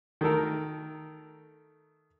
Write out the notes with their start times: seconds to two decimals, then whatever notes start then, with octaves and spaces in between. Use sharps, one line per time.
0.21 D#3 A3 A4 A#4